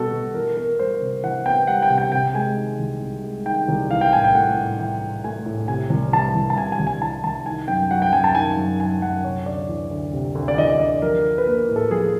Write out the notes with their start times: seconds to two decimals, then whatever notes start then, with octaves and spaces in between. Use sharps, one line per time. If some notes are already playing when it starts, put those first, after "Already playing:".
Already playing: B2 G3 B3 F#4 A4
0.13 B2
0.34 E3 A#4
0.57 B3 A#4
0.79 G3 C5
1.01 C3
1.23 E3 F#5
1.46 B3 G5
1.67 G3 F#5
1.82 G5
1.90 C3
1.98 G5
2.12 C3 G5
2.35 G#3 G#5
2.57 D#3
2.79 C2
3.01 C3
3.24 G#3
3.46 D#3 G5
3.68 C2
3.91 E3 F5
4.01 G5
4.13 A2 G#5
4.24 G5
4.35 A3 F#5
4.56 A2
4.79 E3 G5
5.01 A2
5.24 A3 G#5
5.46 A2
5.68 C3 G#5
5.90 C2
6.13 E3 A5
6.35 C2
6.50 A5
6.57 C3 G#5
6.72 G#5
6.79 C2
6.87 G#5
7.02 E3 A5
7.24 C2 A5
7.46 D#3 G#5
7.68 F#2 G5
7.91 F#3 F#5
8.02 G5
8.13 F#2 G#5
8.24 A5
8.35 D#3 G#5
8.57 F#2
8.80 F#3 G#5
9.02 F#2 F#5
9.24 C3 C#5
9.46 D2 D5
9.69 E3
9.91 D2
10.13 C3
10.35 D2
10.48 D5
10.57 E3 D#5
10.80 D2 D5
11.02 F3 A#4
11.24 D4
11.38 B4
11.47 A#3 A#4
11.69 A2
11.76 A4
11.91 F3 G#4